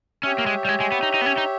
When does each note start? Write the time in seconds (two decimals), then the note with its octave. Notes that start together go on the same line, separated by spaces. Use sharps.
0.23 C#4 G4 C#5 E5
0.38 A#3
0.46 G#3
0.65 G3
0.69 G#3
0.80 G#3
0.92 B3
1.03 D#4
1.14 D#4
1.21 B3
1.26 C#4
1.38 D#4